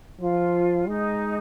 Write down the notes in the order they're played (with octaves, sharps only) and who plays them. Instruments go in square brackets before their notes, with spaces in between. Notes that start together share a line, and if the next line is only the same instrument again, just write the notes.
[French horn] F3 [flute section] F4
[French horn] G#3 [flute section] D#4